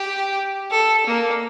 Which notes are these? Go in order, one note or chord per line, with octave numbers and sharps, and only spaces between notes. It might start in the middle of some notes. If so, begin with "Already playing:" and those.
Already playing: G4
A4
A#3